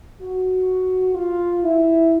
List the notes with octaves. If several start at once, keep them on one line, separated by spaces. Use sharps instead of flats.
F#4
F4
E4